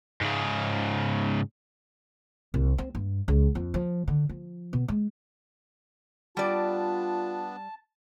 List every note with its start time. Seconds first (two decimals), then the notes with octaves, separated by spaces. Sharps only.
0.21 G#2 C#3
2.54 C2
2.78 C4
2.95 G2
3.28 C#2
3.55 F2
3.74 F3
4.08 D3
4.29 F3
4.73 B2
4.88 G#3
6.37 G3 B3 D4 F4 D5 A5